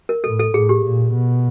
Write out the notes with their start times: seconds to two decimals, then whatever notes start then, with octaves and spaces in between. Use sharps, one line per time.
0.09 A#4
0.24 A2 A4
0.40 A4
0.54 A2 G#4
0.69 G4
0.84 A#2
1.14 B2